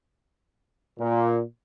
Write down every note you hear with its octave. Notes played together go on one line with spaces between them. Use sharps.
A#2